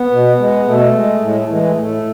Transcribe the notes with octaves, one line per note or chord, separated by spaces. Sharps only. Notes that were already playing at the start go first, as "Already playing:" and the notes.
Already playing: B3
B2
G#3
B2 A3
G#3
A2 G#3
A3
E3 G#3 A3
A3
A2 A3